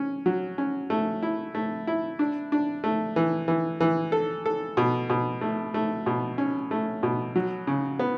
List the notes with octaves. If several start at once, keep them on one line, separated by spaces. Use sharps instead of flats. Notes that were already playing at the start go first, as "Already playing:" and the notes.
Already playing: C#4
F#3
C#4
A3
E4
A3
E4
D4
D4
A3
E3
E3
E3
A4
A4
B2
B2
A3
A3
B2
C#4
A3
B2
F#3
C#3
B3